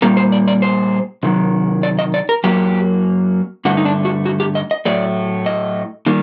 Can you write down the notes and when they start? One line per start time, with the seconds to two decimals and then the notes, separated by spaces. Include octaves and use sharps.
0.02 A#2 G3 A#3 A#4
0.17 C5
0.32 D5
0.48 D5
0.62 C5
1.23 C3 D#3 F#3
1.83 D5
1.99 D#5
2.14 D5
2.29 A#4
2.44 F#2 F#3 A#3 G4
3.65 G2 D3 A3 F#4
3.77 D#4
3.85 D4
4.05 F#4
4.26 F#4
4.40 G4
4.55 D#5
4.71 D#5
4.85 A2 F#3 A3 D5
5.46 D#5
6.06 D#3 G3 A#3